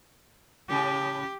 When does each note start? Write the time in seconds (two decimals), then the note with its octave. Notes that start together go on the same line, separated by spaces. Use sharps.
0.70 A2 C#3 G4